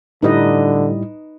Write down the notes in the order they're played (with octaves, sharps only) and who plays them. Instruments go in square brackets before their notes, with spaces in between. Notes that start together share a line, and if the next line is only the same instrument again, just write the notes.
[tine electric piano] A2 G3 E4 [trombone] D3 [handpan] D#4 B4 D#5